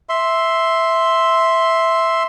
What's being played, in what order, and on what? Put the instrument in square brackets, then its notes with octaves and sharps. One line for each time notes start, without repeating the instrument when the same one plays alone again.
[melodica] E5 C6